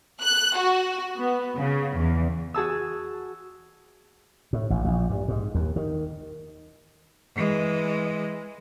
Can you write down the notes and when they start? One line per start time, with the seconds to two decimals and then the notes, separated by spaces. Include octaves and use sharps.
0.22 F#6
0.57 F#4
1.19 B3
1.57 C#3
1.96 E2
2.54 F#4 G#4 A5 E6
4.53 A2
4.70 A1
4.85 A#1
5.10 G2
5.28 G#2
5.55 D#2
5.76 D#3
7.35 E3 G#3